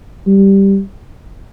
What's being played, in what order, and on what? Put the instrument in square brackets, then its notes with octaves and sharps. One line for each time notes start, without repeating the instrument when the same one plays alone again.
[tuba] G3